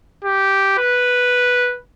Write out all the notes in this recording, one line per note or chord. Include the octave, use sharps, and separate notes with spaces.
G4
B4